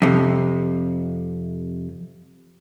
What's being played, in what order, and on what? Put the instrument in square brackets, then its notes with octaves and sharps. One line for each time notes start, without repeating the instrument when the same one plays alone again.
[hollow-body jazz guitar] F2 C3